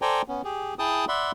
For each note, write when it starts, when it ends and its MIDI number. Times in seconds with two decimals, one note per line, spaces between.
0.02 0.22 69
0.02 0.22 72
0.02 0.22 74
0.02 0.22 79
0.02 0.22 80
0.02 0.22 82
0.28 0.42 59
0.28 0.42 61
0.44 0.74 67
0.44 0.74 68
0.79 1.05 64
0.79 1.05 68
0.79 1.05 79
0.79 1.05 81
0.79 1.05 87
1.08 1.32 74
1.08 1.32 76
1.08 1.32 78
1.08 1.32 83
1.08 1.32 84